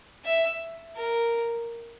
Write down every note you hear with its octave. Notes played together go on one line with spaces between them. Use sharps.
E5
A#4